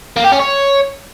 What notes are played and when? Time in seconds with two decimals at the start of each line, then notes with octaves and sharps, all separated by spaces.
0.17 A#3
0.25 G4
0.32 C#4
0.40 C#5